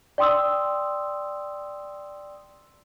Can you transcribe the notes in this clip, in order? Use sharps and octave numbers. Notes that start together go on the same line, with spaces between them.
D5 G5 C6 D#6 E6